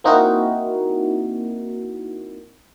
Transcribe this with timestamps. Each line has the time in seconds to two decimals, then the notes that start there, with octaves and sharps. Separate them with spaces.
0.04 A#3 C4 D#4 E4 F#4 A#4